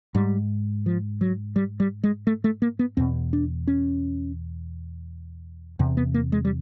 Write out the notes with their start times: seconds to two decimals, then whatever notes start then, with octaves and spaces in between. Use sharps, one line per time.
0.15 G#2 G3
0.86 F3
1.21 F#3
1.56 G3
1.80 G3
2.04 G#3
2.27 A3
2.44 A3
2.62 A#3
2.79 B3
2.97 E2 B2 C4
3.33 D4
3.67 C#4
5.79 E2 C3
5.97 B3
6.14 A#3
6.32 G#3
6.45 G3